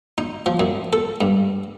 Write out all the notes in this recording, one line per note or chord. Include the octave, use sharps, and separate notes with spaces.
D#4
F3
F#2
A4
G2